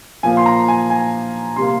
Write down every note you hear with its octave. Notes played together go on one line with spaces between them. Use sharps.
A#2 F3 A#3 G#5
C6
A#5
G#5
G#5
C3 G3 A#3 C6